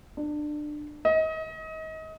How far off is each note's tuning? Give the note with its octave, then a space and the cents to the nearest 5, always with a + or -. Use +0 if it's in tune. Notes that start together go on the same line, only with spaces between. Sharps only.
D4 +25
D#5 +30